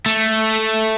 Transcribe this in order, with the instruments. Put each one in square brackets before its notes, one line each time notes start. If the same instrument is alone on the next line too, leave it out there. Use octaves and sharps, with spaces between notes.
[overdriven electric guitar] A3